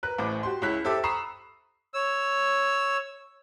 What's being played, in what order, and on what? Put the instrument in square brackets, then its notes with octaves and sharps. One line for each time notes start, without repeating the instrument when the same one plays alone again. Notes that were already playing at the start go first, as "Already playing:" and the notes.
[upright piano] A#4 B4 F#6
A1 A2 C5 D6
F#4 G4 C6
C#2 E4 C#5 F#6 B6
G4 A4 C5 E5 D6 E6
A#5 B5 C#6 D#6 C7 E7
[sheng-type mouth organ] C#5 E6